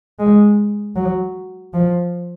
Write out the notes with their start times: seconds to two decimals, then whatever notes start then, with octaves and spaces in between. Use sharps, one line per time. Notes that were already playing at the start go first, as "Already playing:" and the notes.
0.19 G#3
0.96 F#3
1.73 F3